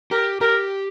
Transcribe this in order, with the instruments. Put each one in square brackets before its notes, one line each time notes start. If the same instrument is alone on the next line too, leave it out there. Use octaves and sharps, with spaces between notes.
[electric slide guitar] G4 [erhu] A#4
[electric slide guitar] G4 [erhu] A#4